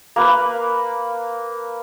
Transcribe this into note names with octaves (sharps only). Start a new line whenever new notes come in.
A#3 B4